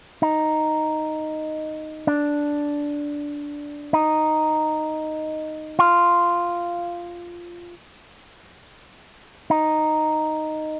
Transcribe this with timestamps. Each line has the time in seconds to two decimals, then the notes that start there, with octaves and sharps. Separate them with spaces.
0.22 D#4
2.07 D4
3.93 D#4
5.79 F4
9.50 D#4